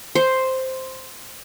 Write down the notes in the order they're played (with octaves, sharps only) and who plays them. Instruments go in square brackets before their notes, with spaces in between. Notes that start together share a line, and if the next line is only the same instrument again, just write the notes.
[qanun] C5